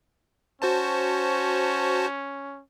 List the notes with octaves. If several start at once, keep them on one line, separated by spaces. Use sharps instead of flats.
C#4 F#4 C5 A5